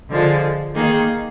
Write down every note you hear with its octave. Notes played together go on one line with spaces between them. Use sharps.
D3 F3 G#3
D#3 A#3 D#4 G#4